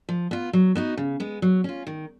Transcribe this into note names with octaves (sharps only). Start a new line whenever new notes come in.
F3
B3 F4
F#3
B3 D#4 F#4
C#3
G#3 B3
F#3
C#4 F4
D#3